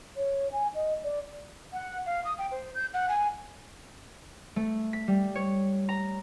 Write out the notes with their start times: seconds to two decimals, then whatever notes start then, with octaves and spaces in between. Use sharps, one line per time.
0.17 C#5
0.52 G#5
0.75 D#5
1.04 D5
1.73 F#5
2.06 F5
2.25 D#6
2.38 G5
2.51 C5
2.75 G6
2.94 F#5
3.09 G#5
4.56 A3
4.93 B6
5.08 G3
5.35 C#5
5.89 A#5